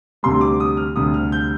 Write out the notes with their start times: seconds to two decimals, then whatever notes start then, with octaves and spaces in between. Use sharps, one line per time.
0.23 D2 C3 G3 C6
0.41 D6
0.60 D#6
0.77 F6
0.96 D2 C3 G3 D#6
1.14 F6
1.32 G6